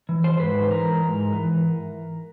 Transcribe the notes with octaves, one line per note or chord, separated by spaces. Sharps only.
E3
C5
G#2 B4
E3 A#4
G#2
E3